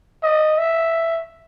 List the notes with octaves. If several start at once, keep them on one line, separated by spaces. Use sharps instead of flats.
D#5
E5